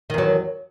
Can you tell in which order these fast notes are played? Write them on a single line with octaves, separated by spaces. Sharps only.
D#3 E2 F#3